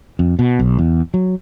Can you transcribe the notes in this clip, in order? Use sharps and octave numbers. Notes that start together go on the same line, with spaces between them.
F2
B2
B1
E2
F#3